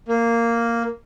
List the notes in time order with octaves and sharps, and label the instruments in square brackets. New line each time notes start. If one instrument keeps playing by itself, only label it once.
[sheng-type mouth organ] A#3